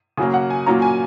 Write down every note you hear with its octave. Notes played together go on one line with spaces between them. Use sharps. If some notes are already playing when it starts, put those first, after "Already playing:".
C#3 F#3 A#3 C#4 G#5
F#5
G#5
A#2 F#3 A#3 C#4 A#5
G#5